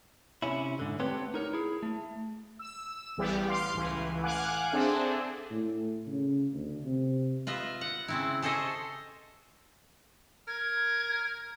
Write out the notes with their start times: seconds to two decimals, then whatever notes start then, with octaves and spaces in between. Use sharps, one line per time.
0.42 C3 C#4 E4
0.79 G#2 D3
0.99 A3 B3 C4 G4 B4 C#5
1.34 D#4 A#4 C#5
1.53 E4 G#4
1.83 A3
2.59 E6
3.17 A1 E3 G3 B3 G4
3.48 F5 C6 D6
3.73 C#2 A2 E3
4.24 F5 F#5 G#5 D6 F#6
4.72 C4 D4 G#4 A4 E5
5.51 A2
6.07 C#3
6.52 D2
6.83 C3
7.47 F4 B4 D#5 E5
7.81 F#5
8.08 C#3 C4 E4
8.42 G#4 A4 C5 C#5 D#5 E5
10.48 A#4 G#6